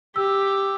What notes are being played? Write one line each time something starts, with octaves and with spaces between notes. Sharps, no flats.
G4 E6